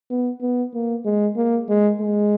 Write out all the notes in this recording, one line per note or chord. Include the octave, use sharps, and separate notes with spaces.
B3
B3
A#3
G#3
A#3
G#3
G#3